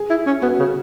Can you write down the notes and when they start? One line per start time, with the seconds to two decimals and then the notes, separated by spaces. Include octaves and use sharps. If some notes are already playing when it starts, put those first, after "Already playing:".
Already playing: G#4
0.10 E4
0.26 C#4
0.42 B3 F#4
0.59 C#3